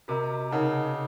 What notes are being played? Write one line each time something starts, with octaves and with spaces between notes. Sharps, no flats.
C3 F#4 A#4 D#5 A#5
C#3 D#4 A#4 D#5 F#5 A5